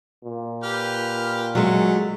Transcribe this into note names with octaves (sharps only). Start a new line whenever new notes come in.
A#2
G4 B4 F6
F#3 G#3 A3